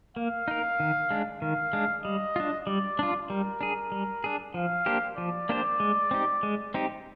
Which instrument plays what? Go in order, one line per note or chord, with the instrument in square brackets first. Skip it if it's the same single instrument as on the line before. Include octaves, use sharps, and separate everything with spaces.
[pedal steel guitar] A#3 [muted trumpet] F5
[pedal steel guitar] D#4 A#4
D#3
G#3 D4
[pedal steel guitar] D#3 [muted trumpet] F5
[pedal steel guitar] G#3 D4
[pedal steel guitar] G3 [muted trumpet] D#5
[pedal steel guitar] D4 F4
[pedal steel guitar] G3 [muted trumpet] D5
[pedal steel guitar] D4 F4
[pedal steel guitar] G3 [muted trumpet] A#4
[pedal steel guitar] D4 G#4
G3
D4 G#4
[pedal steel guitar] F3 [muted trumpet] F5
[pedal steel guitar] A#3 D4 G4 C5
[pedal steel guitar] F3 [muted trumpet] D5
[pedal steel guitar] A#3 D4 G4 C5
G#3
C4 D#4 G4
G#3
C4 D#4 G4